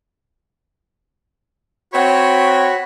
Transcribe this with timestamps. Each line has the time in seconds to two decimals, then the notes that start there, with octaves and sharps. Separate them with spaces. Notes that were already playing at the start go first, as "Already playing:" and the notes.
1.93 C4 F#4 C#5 B5